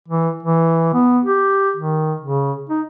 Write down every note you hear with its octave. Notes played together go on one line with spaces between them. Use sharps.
E3
E3
B3
G4
D#3
C#3
D#4